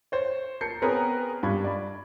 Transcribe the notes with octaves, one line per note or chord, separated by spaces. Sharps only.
C5 C#5
A#4 A5 G6 C7 C#7
B3 C4 G#4 A#4 B4 C#5
G2 B5 C#6 G#6
D5 B5